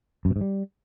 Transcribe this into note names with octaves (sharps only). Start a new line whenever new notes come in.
F#2
B2
G#2
G3